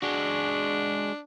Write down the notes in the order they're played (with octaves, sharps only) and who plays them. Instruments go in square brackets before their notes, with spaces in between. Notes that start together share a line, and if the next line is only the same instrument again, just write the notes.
[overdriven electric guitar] G#3 F#4 [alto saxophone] D4